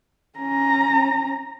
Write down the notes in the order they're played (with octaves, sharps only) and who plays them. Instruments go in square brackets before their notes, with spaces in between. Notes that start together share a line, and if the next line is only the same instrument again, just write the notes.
[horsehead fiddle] C#4 A#5